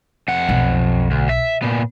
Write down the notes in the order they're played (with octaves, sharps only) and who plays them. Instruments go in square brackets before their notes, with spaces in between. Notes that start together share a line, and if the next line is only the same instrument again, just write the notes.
[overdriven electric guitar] F2 F#5
[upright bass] B1
[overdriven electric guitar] D2
E5
A#2 B3